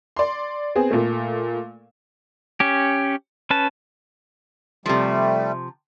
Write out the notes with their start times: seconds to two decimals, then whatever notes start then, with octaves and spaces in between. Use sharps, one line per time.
0.16 D5 C6
0.75 B3 C4 G#4
0.91 A#2 A3
2.60 C#4 G4
3.50 C#4 B4 A5
4.86 C3 F3 G3 A3